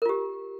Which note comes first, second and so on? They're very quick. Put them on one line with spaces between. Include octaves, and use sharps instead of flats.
A#4 F4 G4